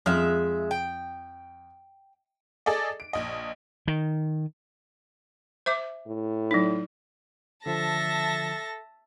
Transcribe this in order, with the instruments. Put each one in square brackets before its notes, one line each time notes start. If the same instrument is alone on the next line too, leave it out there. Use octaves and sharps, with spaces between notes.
[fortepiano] F2 F6 [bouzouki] G#3 E5
[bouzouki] G5
[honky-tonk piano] G#4 A4 D5 D#5
D7
A#1 D#5
[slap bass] D#3
[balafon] C5 E5 D6
[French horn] A2
[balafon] F#3 D#4
[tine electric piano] D3 F3 [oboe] A4 [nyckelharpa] E5 [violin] A5 A#6